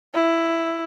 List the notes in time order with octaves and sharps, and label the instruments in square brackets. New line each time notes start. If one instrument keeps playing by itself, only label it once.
[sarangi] E4